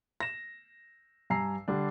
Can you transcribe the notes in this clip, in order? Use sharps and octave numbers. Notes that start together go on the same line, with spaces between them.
A#6 E7
G2 G#5 A#5 E6 C7
D3 G3 D4